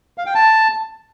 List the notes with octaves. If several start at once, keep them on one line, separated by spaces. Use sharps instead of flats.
F5
G5
A5